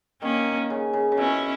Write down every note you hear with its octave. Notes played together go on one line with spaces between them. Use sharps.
D#3 A#3 C#4
C#3
C#3
C#3
B2 C#4 E4